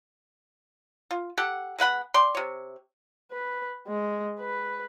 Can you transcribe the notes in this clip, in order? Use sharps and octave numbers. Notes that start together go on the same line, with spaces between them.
F4
G4 A4 F#5
G#3 B3 F#5 B5
D5 G5 C6
C3 C#5
B4
G#3
B4